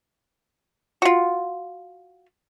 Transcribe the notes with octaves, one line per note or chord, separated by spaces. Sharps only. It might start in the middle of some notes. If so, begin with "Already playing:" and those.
F4 F#4